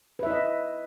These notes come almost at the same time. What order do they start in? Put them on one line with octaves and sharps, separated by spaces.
B4 E5 E4 D#5